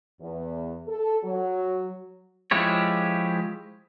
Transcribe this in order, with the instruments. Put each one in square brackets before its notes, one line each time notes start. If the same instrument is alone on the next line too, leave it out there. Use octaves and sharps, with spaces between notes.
[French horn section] E2
A4
F#3
[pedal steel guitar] F3 G#3 E4 G4 C#5